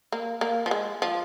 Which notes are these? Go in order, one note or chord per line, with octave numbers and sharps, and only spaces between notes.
A#3
A#3
F3
G#3
F3